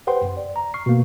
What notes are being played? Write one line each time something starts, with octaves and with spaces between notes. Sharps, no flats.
G4 B4 C5 F#5 G5 C6
F#2
D5
A#5
C#6 F6 C7
B2 A#3